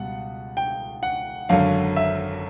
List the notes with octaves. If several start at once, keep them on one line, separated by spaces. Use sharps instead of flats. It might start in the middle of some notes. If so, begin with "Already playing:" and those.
Already playing: C#2 B2 G3 F#5
G5
F#5
G#1 F#2 D3 F#3 F5
E5